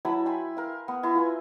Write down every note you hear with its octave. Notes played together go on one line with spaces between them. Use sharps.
F#3 E4 A5 B5
G5 G#5 B5 C6
A#4 F5
B3
E4 A#5 C6
F4 B4 G#5